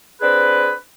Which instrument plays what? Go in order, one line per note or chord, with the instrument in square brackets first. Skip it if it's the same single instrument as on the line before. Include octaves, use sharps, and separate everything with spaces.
[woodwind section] C4 D4 G#4 B4